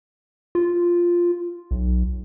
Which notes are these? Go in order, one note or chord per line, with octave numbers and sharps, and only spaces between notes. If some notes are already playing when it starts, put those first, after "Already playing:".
F4
B1